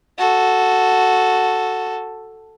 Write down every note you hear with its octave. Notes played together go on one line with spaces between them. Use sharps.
F#4 A4